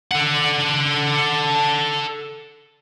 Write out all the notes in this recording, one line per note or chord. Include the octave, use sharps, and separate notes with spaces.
A4 F#5